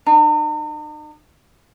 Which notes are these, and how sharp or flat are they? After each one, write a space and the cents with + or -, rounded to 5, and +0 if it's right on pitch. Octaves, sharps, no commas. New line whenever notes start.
D#4 -45